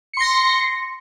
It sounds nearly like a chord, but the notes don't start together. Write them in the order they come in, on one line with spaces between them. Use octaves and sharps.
C#7 C6 A#6